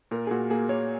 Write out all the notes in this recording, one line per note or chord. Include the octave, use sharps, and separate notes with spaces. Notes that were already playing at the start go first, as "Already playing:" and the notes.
A#2 A#4
G#4
A#2 F#4
A#3 G#4
A#3 C#5